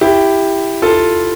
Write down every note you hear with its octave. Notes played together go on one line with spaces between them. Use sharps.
E4 G4
F4 A4